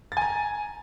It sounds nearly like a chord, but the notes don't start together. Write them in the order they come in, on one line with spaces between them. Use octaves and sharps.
A6 G#5 A#5